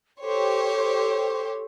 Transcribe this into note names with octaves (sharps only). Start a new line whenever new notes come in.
G4 A4 C5 C#5